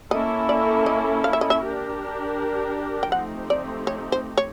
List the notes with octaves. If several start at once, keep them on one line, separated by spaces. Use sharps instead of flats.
A#3 C#4 E4 A4 D#5
D5
D#5
F5
E5
D#5
E5
D4 G4 A#4
G5
F3 A3 C4 D#4 G4 F#5
D5
C#5
C5
C#5